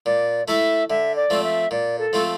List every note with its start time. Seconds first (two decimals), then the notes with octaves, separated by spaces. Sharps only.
0.06 A#2 D5
0.47 A3 E4 A4 E5
0.90 D3 E5
1.16 D5
1.30 F3 A3 C4
1.44 E5
1.71 A#2 D5
1.99 A4
2.13 F3 A3 C4 F4